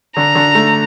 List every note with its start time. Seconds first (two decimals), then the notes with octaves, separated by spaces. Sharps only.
0.17 D3 A#5
0.35 D3
0.55 A3